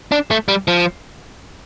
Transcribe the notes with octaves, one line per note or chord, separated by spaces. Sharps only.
D4
A3
G3
F3